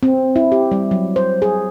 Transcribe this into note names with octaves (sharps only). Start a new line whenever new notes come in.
C4
E4
G4
G3
F#3
C5
G#4